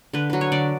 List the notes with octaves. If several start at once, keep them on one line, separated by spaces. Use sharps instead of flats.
D3 B4
F#3 B4
C#5
D3 D5